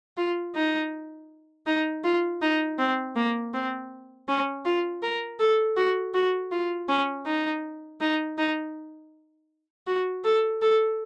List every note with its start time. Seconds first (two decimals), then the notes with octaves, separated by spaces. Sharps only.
0.17 F4
0.55 D#4
1.67 D#4
2.04 F4
2.42 D#4
2.79 C4
3.16 A#3
3.54 C4
4.28 C#4
4.65 F4
5.02 A#4
5.40 A4
5.77 F#4
6.14 F#4
6.51 F4
6.89 C#4
7.26 D#4
8.01 D#4
8.38 D#4
9.87 F#4
10.24 A4
10.62 A4